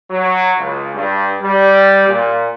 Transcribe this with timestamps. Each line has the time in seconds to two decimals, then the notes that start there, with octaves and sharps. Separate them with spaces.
0.11 F#3
0.58 C#2
0.96 G2
1.42 G3
2.08 A#2